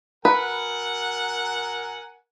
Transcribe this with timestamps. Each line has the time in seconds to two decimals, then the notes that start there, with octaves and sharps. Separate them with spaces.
0.25 A#4 B4 F#5 G#5